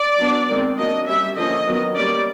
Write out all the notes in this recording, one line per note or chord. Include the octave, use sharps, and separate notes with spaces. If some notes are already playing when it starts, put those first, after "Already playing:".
Already playing: D5
F#3 B3 D4
D#3 G#3 C4
F#3 A#3 D4 D#5
G3 A#3 C#4 E5
D3 F3 A#3 C#4 D#5
D#3 F#3 B3
G3 A#3 C#4 D5